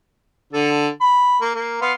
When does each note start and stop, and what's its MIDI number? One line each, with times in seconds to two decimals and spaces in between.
0.53 0.89 50
0.53 0.89 69
1.01 1.39 83
1.42 1.50 58
1.54 1.78 58
1.81 1.93 59
1.81 1.93 77
1.81 1.93 84